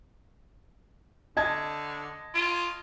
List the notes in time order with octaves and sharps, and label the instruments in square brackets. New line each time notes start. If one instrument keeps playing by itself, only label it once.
[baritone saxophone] D3 [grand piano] D#5 A5 G#6
[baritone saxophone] F4